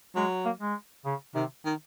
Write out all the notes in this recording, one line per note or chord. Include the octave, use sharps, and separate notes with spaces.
F#3 G#3
A#3
G#3
C#3
C3 D#3
D#3